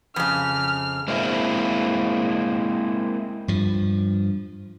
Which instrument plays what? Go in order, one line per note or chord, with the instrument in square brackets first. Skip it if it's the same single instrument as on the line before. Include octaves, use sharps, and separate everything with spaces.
[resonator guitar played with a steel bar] F2 C#3 [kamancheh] F6
[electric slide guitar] G#3 A#3 C4 E4
[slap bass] G2 F3